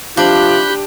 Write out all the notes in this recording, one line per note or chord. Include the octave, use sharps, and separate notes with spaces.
C3 F3 D4 G4 B5 F#6 G6